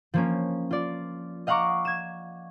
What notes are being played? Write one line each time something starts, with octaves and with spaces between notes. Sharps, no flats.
F3 A#3 C#4
F4 D5
D#5 F5 F#5 A#5 C#6 D6
G#6 E7